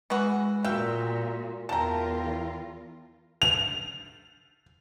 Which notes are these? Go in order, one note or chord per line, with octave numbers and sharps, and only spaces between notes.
E3 G#3 B3 F#4
A#2 F#4 E5 F5 G5
E2 E4 F4 A#4 F5 G5 A5 A#5
F7